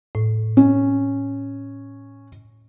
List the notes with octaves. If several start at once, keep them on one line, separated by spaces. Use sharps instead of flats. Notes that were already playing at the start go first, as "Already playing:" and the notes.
A2
C#4